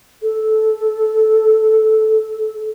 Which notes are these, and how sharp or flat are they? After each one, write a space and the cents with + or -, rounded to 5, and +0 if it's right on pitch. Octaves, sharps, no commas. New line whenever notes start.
A4 -15